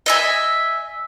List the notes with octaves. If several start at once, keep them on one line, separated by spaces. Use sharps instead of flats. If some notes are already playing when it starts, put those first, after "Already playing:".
D#5 E5 G#5